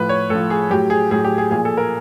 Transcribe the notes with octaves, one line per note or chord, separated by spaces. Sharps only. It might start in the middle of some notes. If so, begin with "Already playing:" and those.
Already playing: A2 F3 B4
C#5
A2 F3 A4
G#4
A2 F#3 G4
G#4
A2 F#3 G#4
G4
G#4
A#2 F3 G#4
A4
A#4